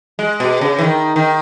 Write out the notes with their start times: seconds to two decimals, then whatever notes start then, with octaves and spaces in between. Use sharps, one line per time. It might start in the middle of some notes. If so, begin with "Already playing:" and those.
0.19 G#3
0.40 B2
0.61 C#3
0.79 E3
0.84 D#3
1.16 D#3